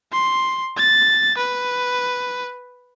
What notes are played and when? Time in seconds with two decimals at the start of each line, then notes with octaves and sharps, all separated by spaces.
0.12 C6
0.77 A6
1.38 B4